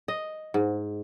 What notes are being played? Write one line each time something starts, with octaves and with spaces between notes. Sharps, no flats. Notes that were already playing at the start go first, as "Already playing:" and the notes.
D#5
G#2